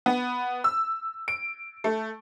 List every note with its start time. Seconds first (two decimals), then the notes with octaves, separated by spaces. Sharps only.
0.06 B3
0.64 E6
1.28 D7
1.84 A3